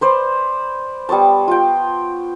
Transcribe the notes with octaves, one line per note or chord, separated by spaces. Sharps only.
B4 C5 D5
G3 B3 C#5 A5
F4 G5